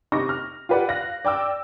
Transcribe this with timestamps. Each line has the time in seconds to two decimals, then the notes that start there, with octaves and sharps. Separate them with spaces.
0.12 C3 D#4 C#6 D6 A#6
0.29 F6
0.69 F4 G4 B4 D5 F#5
0.89 F5 F#6 A#6
1.25 D5 G5 D6 E6